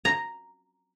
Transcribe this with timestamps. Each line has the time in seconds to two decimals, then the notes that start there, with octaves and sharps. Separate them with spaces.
0.05 A#5